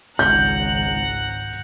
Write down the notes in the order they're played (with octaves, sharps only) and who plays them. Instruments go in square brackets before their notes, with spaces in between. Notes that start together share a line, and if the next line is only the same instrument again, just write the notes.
[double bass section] G#1 C#2 [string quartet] F#5 A#5 F#6 [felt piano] G6